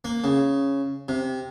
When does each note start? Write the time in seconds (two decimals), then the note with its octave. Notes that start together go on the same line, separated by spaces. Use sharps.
0.05 A#3
0.24 C#3
1.09 C3